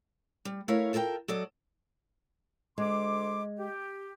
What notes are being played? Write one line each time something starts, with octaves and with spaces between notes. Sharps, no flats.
G3
A3 E4 A#4 C#5 F5
F4 A4 A#4 D#5 G5
F#3 A4 D5 D#5
D2 G#3 C6 D6
G4